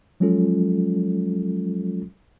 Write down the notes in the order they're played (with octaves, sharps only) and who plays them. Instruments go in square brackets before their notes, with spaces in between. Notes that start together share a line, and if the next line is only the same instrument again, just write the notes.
[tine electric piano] F3 F#3 G#3 C#4 F4 A4